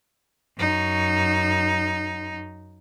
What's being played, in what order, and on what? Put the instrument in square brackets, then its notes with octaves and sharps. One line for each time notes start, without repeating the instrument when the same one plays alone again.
[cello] F#2 D#4